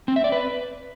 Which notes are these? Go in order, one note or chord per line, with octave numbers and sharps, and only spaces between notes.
C4
E5
D5
B4